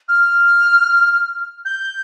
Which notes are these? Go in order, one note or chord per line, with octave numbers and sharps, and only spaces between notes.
F6
G6